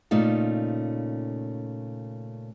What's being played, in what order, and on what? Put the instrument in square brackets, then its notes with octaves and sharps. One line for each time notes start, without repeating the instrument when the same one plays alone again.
[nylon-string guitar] A#2 C#3 A3 D#4 F4